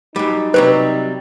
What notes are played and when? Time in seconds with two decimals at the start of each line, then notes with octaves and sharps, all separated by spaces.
0.16 F#2 G3 D#4
0.54 C3 F#3 G3 B4